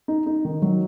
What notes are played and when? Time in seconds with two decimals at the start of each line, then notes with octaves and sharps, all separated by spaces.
0.08 D#4
0.26 D#4
0.45 D#3
0.62 F#3